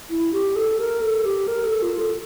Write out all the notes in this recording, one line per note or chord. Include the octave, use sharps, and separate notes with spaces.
E4
G4
A4
A#4
A4
G4
A#4
A4
F4
A4